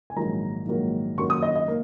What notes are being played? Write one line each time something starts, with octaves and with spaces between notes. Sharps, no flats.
G#5
A#1 G#2 D#3 F#3 A#3 A#5
A#1 G#2 D#3 F#3 A#3
F#2 D#3 F#3 A#3 C#6
D#6
D#5
D#5
A#3